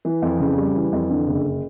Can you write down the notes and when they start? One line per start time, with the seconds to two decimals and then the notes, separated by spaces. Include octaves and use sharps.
0.05 E3
0.22 F2
0.40 C#3
0.58 G3
0.76 E3
0.93 F2
1.10 D3
1.28 F#1